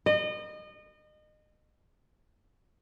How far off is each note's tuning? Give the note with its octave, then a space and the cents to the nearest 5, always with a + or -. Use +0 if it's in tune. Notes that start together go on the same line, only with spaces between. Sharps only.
D#5 -30